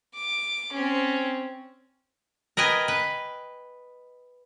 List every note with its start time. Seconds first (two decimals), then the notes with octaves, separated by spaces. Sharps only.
0.15 D6
0.73 C4 C#4
2.57 A#4 B4 D#5 G5 G#5
2.88 B4